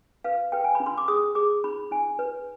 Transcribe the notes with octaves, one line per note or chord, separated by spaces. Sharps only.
B4 F5
B4 G5
G#5
B5
D4
C6
D6
G#4 D#6
G#4 D6
D#4 B5
D#4 G#5
B4